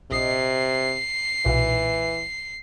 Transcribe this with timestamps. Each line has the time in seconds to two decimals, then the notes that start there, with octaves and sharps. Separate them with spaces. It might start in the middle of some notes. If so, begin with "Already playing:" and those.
0.11 A#1 C3 D#5 C7
1.46 B1 A#2 E3